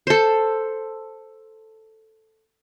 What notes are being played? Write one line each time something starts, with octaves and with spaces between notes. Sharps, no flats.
A4 C5